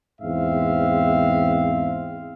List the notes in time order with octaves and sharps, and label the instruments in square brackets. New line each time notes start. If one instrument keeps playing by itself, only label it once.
[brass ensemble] E2 G#2 C4 E5 F5